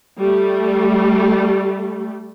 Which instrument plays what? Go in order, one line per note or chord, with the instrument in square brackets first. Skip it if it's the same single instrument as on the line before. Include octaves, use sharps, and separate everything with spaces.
[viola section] G3 A3